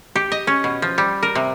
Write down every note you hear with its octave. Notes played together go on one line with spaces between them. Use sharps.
G4
D#5
C#4
B2
F3
G3
A#4
C3